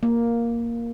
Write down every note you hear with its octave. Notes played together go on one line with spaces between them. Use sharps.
A#3